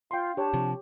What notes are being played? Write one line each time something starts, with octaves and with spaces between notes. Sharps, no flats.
F4 F5 G5 C6
D4 G4 C#5 A5
C3 F3